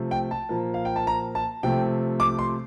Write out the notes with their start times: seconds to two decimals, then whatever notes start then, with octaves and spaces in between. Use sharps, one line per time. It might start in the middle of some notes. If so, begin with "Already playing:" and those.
Already playing: C3 F3 A3
0.11 G5
0.31 A5
0.49 A#2 F3 A#3
0.74 F5
0.85 G5
0.96 A5
1.07 A#5
1.35 A5
1.63 C3 F3 A3 G5
2.20 D6
2.39 C6